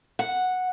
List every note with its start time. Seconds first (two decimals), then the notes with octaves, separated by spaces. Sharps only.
0.19 F#5